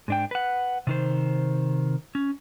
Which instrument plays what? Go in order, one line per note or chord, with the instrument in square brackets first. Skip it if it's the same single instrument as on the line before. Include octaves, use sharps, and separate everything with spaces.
[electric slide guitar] G#2 D4 G5
B4 F#5
C3 D#3 C5
C#4